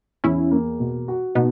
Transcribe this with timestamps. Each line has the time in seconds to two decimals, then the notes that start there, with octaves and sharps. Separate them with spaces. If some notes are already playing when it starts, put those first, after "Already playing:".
0.24 E2 C#4 E4
0.51 A#3
0.80 B2
1.08 F#4
1.35 B2 B3 D#4